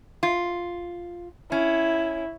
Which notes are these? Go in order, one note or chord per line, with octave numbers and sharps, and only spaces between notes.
F4
C#4 E4